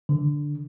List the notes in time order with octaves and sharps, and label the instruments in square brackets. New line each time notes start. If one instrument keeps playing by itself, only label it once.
[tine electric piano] D3